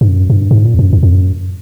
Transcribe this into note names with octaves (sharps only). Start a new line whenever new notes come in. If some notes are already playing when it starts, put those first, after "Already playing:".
G2
F#2
G2
G#2
A#2
F2
F#2
F2
F2
F#2